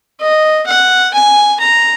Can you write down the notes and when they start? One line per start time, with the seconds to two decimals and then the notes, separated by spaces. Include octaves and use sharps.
0.21 D#5
0.67 F#5
1.14 G#5
1.60 A#5